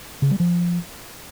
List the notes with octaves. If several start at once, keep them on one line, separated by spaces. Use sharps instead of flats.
C#3
G3
F3